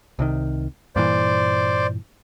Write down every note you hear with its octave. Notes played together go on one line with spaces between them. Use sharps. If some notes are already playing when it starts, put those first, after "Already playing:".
C2 C3 D#3
G2 A#2 E3 C5 D5